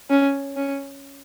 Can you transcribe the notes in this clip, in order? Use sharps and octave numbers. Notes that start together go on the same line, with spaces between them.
C#4
C#4